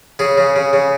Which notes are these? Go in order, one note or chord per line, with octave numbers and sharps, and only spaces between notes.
C#3 G#4
C#3
C#3
C#3